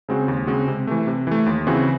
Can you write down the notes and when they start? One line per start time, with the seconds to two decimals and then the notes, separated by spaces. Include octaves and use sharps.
0.09 C#3 G#3 C4 F#4
0.28 D#2
0.47 C#3 G#3 C4 F#4
0.68 C3
0.87 E3 A3
1.07 C3
1.27 E3 A3
1.46 D#2
1.67 C#3 E3 C4 F#4